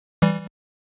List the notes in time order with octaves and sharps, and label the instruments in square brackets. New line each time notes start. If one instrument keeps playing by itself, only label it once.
[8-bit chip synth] E3 G3